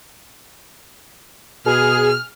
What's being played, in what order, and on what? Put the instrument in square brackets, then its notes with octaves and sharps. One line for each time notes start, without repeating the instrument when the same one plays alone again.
[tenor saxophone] B2 [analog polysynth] G#4 [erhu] F6